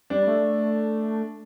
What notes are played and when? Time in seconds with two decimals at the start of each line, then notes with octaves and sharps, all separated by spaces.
0.10 G3 D4
0.27 A3